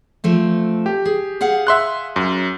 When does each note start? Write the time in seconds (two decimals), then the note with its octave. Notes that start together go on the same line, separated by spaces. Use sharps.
0.24 F3 A3 C4
0.86 G4
1.05 G#4
1.41 G#4 F5 F#5
1.67 E5 C6 F#6
2.16 F#2